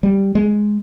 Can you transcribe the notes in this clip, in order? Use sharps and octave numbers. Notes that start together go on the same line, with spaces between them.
G3
G#3